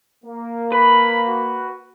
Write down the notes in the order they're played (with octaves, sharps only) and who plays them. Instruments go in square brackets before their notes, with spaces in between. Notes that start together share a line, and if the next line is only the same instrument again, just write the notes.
[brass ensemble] A#3
[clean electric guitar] B4 [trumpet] B5
[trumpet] F#4